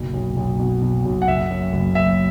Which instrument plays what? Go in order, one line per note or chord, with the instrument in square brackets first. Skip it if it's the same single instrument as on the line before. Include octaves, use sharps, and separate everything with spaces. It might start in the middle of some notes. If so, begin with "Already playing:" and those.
Already playing: [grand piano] F#1 B1
B1
B1
B2
B2
B1
F#5
F#1 E5
F#2
F#1
F#2 E5